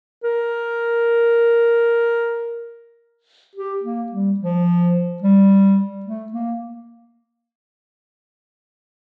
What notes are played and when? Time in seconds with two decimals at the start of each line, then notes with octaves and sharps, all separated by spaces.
0.24 A#4
3.56 G4
3.83 A#3
4.12 G3
4.40 F3
5.22 G3
6.06 A3
6.32 A#3